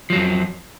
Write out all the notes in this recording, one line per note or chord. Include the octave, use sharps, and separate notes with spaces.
F2 F3 F#3